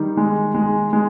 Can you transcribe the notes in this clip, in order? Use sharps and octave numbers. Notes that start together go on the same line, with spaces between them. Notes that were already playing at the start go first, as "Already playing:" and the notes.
Already playing: D#3 G3
G#3
G#3
G#3